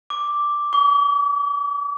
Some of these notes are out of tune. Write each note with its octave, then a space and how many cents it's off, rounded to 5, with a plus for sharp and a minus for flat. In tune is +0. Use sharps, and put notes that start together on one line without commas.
D6 +0
D6 -45